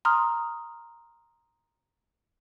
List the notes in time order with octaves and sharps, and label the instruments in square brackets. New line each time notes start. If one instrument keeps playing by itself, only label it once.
[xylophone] A#5 C6 D#6 F6